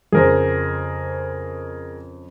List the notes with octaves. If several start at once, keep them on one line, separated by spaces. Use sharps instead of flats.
F2 C#3 G#4 A#4 C5